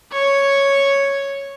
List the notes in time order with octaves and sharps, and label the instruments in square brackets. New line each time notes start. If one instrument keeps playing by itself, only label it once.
[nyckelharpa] C#5